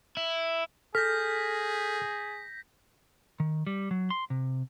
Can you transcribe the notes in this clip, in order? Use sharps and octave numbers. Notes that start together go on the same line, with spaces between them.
E4
G#4 A4 F6 G6 A#6 B6
D#3
G3
F#3
C6
C3